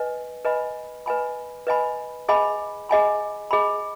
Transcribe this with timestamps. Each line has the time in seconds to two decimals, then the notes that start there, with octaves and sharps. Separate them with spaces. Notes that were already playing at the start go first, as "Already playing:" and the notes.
Already playing: B4 D#5 G#5
0.45 B4 D#5 G#5 B5
1.06 B4 D#5 G#5 B5
1.67 B4 D#5 G#5 B5
2.29 G#4 D#5 G#5 B5
2.89 G#4 D#5 G#5 B5
3.51 G#4 D#5 G#5 B5